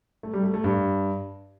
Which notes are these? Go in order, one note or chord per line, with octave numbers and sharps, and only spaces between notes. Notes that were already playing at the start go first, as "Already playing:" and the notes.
A3
G3
A3
A3
G2